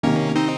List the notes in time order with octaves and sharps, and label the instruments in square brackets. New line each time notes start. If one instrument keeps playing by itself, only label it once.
[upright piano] C3 D#3 [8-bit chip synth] A#3 C#4
[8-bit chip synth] C4 D#4